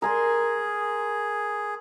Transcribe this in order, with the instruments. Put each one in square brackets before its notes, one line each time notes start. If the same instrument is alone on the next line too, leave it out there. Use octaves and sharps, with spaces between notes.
[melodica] G#4 [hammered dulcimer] A#4 G#5 C6